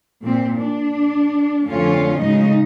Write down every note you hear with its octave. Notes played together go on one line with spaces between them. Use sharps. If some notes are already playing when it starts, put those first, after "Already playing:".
A#2 C4
D4
F2 D3 A3 C#4 F4 C#5
A2 C#3 F#3 G#3 D#4 D#5